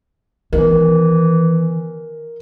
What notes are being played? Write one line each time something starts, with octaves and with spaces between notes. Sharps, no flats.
D#3 E3 B3 A#4